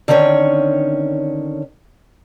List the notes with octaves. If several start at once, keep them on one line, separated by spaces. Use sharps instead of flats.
D3 D#3 C4 C#4 C#5